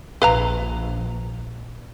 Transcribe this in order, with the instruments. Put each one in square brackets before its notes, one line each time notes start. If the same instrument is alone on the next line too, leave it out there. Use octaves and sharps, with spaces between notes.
[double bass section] A#1 [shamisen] B4 F5 A#5